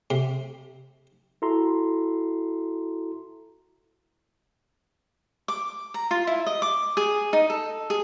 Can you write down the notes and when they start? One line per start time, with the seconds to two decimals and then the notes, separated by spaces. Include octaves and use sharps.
0.10 C3
1.42 E4 F#4 A4 A#5 C6
5.48 D6
5.94 A#5
6.11 F4
6.27 E4
6.46 D#5
6.62 D6
6.97 G#4
7.33 D#4
7.50 A4
7.90 G#4